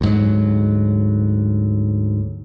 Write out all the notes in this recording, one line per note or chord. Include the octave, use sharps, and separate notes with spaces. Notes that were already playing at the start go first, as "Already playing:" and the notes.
D2 G#2 F#3